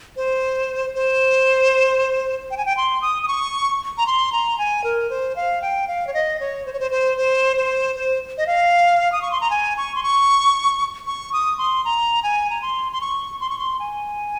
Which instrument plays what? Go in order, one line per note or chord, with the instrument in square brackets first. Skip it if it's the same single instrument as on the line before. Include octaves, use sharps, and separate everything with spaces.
[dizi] C5
C5
G5
G#5
G5
C6
D#6
D#6
C#6
A#5
C6
A#5
G#5
A#4
C5
F5
G5
F5
C#5
D#5
C#5
C5
C#5
C5
C5
C5
C5
C5
D#5
F5
D#6
C#6
C6
A#5
G#5
C#6
C6
C#6
C#6
D#6
C6
A#5
G#5
A#5
C6
C6
C#6
C6
C#6
C6
G#5